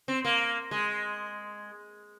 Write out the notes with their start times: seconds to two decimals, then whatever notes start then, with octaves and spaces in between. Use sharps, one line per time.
0.08 C4
0.25 A#3
0.71 G#3